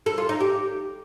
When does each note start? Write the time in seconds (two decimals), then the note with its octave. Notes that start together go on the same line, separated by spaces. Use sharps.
0.06 A4
0.18 F4
0.29 D#4
0.40 G4